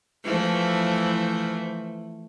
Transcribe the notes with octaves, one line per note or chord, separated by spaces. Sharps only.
E3 F3 A3